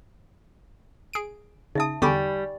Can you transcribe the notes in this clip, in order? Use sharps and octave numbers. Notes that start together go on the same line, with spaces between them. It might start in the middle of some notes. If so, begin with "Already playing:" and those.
G#4 D7
C#3 D#4 E5 A5 D#6
E2 D3 G3 G#5 B5 C#6 D6